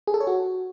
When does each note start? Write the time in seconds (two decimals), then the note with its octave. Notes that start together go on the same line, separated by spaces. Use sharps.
0.07 G#4
0.14 A4
0.21 C#5
0.27 F#4